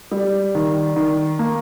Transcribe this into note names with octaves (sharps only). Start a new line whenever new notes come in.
G3
D#3
D#3
A#3